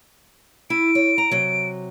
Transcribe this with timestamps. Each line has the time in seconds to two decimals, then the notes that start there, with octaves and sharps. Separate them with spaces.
0.70 E4 D7
0.95 C#5
1.18 A#5
1.31 C3 F#3